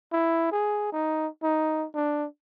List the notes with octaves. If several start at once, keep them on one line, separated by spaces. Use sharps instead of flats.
E4
G#4
D#4
D#4
D4